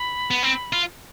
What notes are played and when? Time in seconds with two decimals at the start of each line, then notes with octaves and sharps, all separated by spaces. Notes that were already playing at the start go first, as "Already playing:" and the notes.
Already playing: B5
0.31 B3
0.43 C4
0.73 F4